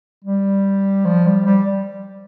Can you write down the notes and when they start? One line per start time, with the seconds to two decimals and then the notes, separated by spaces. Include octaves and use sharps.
0.24 G3
1.05 F3
1.26 G3
1.46 G3